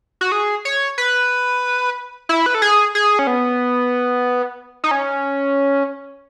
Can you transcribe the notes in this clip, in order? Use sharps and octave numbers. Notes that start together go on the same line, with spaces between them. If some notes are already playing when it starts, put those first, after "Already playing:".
F#4
G#4
C#5
B4
E4
B4
A4
G#4
G#4
C#4
B3
D#4
C#4